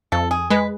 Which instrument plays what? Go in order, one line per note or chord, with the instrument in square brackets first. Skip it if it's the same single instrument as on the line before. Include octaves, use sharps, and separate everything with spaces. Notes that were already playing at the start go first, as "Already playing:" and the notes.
[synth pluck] F2 [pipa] A4
[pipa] G#4
[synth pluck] G#3 [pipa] B4